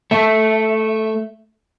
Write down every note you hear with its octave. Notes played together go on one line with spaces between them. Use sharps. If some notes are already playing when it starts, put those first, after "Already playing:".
A3 E5